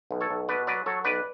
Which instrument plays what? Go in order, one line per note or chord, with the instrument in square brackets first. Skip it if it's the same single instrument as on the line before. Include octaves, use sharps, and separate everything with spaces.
[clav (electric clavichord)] B1
A4 C#5
B1
B2 B4 D5
F#3 B4 D5
F#3 A4 C#5
B1 B4 D5